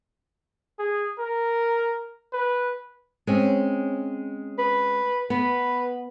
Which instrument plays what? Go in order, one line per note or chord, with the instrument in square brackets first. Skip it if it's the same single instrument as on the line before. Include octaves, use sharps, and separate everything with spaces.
[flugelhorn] G#4
A#4
B4
[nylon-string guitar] G#3 C4 C#4
[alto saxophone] B4
[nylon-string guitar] B3 [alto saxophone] B4